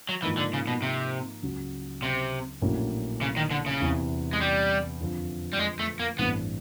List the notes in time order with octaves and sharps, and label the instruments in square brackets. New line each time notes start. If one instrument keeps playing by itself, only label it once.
[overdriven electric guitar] F#3
[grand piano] G#2 F3 A#3 D#4 [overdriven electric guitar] E3
[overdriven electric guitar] D3
C#3
B2
C3
[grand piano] C#2 C#3 F#3
[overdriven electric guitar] C3
[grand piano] A#1 A2 F#3 A#3 C#4
[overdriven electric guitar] C#3
D#3
D3
C#3
[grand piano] E2 C3 E3
[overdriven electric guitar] G#3
G3
[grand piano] F2 D3 F3
[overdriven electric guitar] G3
G#3
A3
A#3
[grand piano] A1 G2 E3 A3 C4 [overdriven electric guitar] B3